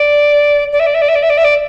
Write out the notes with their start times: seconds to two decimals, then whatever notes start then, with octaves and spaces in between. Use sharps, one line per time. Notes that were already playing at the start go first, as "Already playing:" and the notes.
Already playing: D5
0.72 D5
0.79 E5
0.86 D5
0.94 E5
1.02 D5
1.08 E5
1.15 D5
1.22 E5
1.30 D5
1.37 E5
1.44 D5